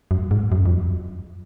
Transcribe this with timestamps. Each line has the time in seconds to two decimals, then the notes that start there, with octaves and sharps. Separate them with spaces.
0.11 F#2
0.31 G#2
0.52 F#2
0.66 F2